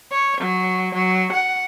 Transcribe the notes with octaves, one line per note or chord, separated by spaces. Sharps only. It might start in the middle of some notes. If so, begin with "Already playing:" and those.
C#5
F#3
F#3
F#5